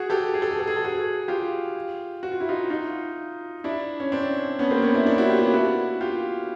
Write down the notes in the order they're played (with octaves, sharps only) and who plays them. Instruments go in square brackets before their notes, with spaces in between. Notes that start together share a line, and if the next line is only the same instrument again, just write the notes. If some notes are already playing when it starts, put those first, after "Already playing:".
Already playing: [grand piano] F#4 G#4
G4 A4
G#4
A4
G#4
A4
G#4
A4
F#4 G#4
F4 G4
F#4
F4
E4
D#4 F4
D#4 F4
D4 E4
C#4
C4 D4
B3 C#4
A#3 C4
B3 C#4
D4 E4
D4 E4
E4 F#4
F4 G4
B3 C#4
E4 F#4
F4 G4